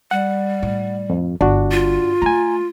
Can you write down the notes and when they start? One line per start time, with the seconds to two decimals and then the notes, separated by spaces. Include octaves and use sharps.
0.11 G3 F#5
0.63 A2
1.10 F2
1.41 G1 D4 F#4
1.71 F4
2.22 A3 G#5 A#5